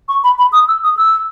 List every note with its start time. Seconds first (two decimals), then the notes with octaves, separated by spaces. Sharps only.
0.09 C#6
0.24 B5
0.39 B5
0.52 D#6
0.68 E6
0.83 D#6
0.97 E6